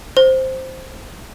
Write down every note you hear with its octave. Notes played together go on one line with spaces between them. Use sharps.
C5